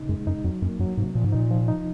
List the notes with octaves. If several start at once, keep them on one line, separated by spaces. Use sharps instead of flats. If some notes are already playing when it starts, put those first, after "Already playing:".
Already playing: A#2 C#3 D#4
F#2 G#3
F#2 D#4
F2 F#3
F#2 A#3
F#2 F#3
G#2 C3
A#2 F3
G#2
A#2 D#4
F3
D#4